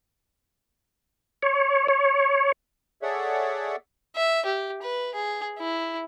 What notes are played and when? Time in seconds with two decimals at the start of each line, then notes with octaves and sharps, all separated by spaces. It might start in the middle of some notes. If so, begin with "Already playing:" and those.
1.43 C#5
1.88 C#5
3.02 G#4 A4 C#5 D5 E5 F#5
4.16 E5
4.45 G4
4.82 B4
5.14 G#4
5.59 E4